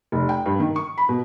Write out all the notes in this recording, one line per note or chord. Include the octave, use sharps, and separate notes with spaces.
F1
G5
G2
D#3
C#6
B5
B2